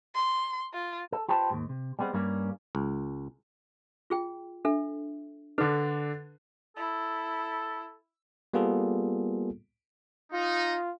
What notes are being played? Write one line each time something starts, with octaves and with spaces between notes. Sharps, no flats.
C6
F4
A4
F4 G4 B4 C5 A5
D#2 G#2
C3
G3 G#3 B3 C4
G2 G3 A#3 C#4
C#2
F4 G#4 G5
D4 A4 E5
D3 D4 A4 B4
E4 A4
G3 A#3 B3 F4 G#4 A4
D#4 F4